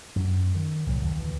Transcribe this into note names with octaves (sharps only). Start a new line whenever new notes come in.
F#2
D#3
C2 A#2 F#3
D#2
D2 E3